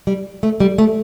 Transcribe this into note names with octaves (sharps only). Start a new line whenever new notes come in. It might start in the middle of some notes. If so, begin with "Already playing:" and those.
G3
A3
G3
A3